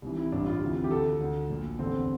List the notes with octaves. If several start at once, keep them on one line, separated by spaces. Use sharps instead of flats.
C2 C3 E3
E4
A1 G2 E3 D4
F4
D2 C3 E3
G4
D2 D3 A4
D2 D3
A#1 A#2
F1 E2 D3 C4